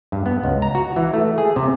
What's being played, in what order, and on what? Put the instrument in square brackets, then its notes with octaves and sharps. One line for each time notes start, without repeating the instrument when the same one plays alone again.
[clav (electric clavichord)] G2
B3
C#2
A#5
F#4
E3
A3
G#4
C3